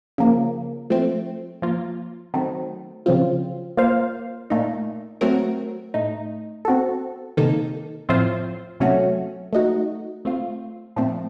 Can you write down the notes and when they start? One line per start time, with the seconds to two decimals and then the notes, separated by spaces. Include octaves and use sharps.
0.18 C#3 F3 A#3
0.90 F3 A3 C4
1.62 F3 A#3 F4
2.34 D#3 F#3 A3 C4
3.06 C#3 F3 C4 F4
3.77 A#3 F4 C5 F5
4.50 A#2 A3 D#4
5.21 F#3 A3 C4 F#4 A#4
5.94 A2 A3 D#4
6.65 C4 F#4 A4
7.37 C3 D#3 A#3 D#4 A4
8.09 A2 F3 C4 F4 C5
8.80 C3 F#3 A3 C#4 F#4
9.53 A3 D#4 F#4
10.25 A3 C4 F4
10.96 A#2 F3 A3 C4